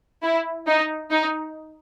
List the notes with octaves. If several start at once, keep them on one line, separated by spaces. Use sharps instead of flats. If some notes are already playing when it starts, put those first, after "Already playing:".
E4
D#4
D#4